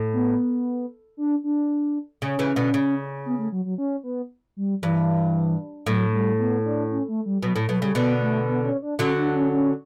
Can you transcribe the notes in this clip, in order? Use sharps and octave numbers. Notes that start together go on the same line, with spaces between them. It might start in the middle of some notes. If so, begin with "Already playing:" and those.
Already playing: A2
B3
D4
D4
C#3 C#4
C#3 E3
B2 D3
C#3
B3
A3
F#3
F#3
C#4
B3
G3
G2 E3
A2 F#3
G3
B3
D4
C#4
A3
G3
B2 F#3
A2
B2 F#3
C#3 G3
B2 D3 B3
A3
B3
C#4
D4
D3 F#3 C#4
D4
C#4
C#4